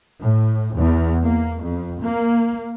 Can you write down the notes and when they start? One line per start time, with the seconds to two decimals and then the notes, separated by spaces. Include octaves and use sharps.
0.20 A2
0.75 E2
1.23 A#3
1.62 F2
2.02 A#3